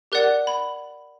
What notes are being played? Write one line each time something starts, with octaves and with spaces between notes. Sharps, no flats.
G4 A#4 D5 F#5 F#6
B5